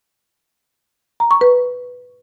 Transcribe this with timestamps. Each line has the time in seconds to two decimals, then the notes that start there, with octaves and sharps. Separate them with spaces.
1.20 A#5
1.31 C#6
1.41 B4